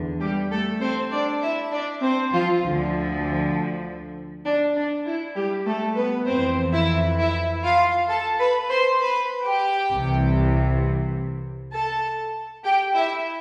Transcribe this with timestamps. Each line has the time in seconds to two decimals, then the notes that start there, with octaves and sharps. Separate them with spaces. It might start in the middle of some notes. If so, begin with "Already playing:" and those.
Already playing: E2 D3
0.20 G3 G4
0.51 A3 A4
0.81 C4 C5
1.11 D4 D5
1.42 E4 E5
1.72 D4 D5
2.02 C4 C5
2.32 F3 F4
2.63 D2 D3 F3
4.45 D4
4.76 D4
5.06 E4
5.36 G3 G4
5.66 A3 A4
5.96 B3 B4
6.27 F2 E3 C4 C5
6.72 E4 E5
7.18 E4 E5
7.64 F4 F5
8.09 A4 A5
8.40 B4 B5
8.70 C5 C6
9.00 B4 B5
9.45 G4 G5
9.91 C2 C3 E3
11.73 A4 A5
12.64 G4 G5
12.94 E4 E5